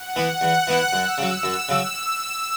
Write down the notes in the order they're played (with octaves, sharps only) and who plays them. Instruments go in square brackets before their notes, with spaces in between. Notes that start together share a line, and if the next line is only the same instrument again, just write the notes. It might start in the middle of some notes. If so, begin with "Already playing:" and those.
Already playing: [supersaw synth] F#5
[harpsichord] E3 B3 E4
[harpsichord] E2 [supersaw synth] F#6
[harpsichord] E3 B3 E4
[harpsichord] F#2 [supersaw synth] E6
[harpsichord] C#3 F#3
F#2
C#3 F#3